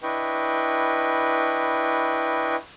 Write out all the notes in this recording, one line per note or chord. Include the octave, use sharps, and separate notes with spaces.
D4 E4 B4 D#5 G5 C#6